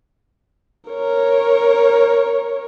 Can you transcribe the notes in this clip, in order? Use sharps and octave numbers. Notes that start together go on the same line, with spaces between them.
A#4 C#5